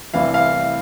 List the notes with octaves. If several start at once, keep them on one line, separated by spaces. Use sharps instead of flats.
C2 C3 E3 F5
F5